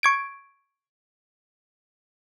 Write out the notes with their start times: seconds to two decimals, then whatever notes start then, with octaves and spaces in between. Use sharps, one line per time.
0.03 C#6 G#6 D7